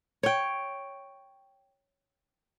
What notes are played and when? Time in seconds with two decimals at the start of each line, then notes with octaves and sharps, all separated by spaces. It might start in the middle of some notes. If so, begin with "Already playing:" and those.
0.23 C#5 G5